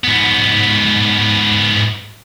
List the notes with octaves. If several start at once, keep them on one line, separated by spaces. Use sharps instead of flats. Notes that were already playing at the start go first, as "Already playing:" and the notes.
G#2 B3